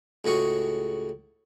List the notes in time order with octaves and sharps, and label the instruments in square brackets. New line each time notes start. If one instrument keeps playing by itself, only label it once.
[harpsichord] C#2 A2 F#4 G#4 C#6